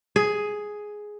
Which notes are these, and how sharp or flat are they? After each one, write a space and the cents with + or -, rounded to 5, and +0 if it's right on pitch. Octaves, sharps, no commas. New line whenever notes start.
G#4 +5